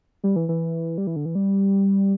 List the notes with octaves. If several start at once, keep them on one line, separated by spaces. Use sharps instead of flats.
G3
E3
E3
G3
E3
D3
E3
G3